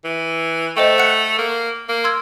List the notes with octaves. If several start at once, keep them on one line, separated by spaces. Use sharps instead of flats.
E3
A3 C5 D#5 G5
F#5 F#6 C#7
A#3
A#3
C6 E6 G#6